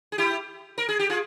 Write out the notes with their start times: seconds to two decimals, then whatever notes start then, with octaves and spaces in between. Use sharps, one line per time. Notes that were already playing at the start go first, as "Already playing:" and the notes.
0.12 G#4
0.18 E4 G4
0.78 A#4
0.89 G#4
0.99 G4
1.10 F4 G#4